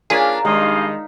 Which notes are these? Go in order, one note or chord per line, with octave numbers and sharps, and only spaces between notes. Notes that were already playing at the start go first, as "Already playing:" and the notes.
A#3 D4 F4 G#4 A#4 C#5 B6
G2 D#3 G#3 D#5 F5